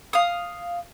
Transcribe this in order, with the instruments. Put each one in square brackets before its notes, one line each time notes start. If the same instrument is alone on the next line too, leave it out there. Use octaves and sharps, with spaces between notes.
[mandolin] F5 D#6